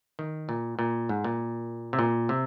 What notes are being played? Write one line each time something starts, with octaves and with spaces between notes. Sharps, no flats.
D#3
A#2
A#2
G#2
A#2
C3
A#2
C3